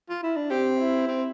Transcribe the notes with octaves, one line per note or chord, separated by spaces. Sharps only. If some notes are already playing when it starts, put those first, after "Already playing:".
F4
E4
D4
C4 G4
E4
C4